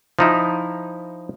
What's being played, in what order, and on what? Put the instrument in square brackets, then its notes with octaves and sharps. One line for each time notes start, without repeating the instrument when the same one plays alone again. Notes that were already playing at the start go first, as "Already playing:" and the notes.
[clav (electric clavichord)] F3 D#4 E4